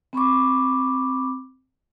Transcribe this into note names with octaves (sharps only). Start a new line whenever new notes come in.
C4 B5 C#6 D6